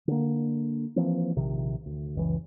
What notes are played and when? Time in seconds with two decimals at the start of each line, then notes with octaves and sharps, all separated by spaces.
0.08 D3 A#3
0.96 E3 F3 A#3 C4
1.36 A#1 C3 D#3
1.86 D2
2.15 F#1 C#2 E3